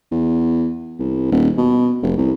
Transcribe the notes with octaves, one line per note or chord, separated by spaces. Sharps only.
E2
C2
D#1
B2
F1
C2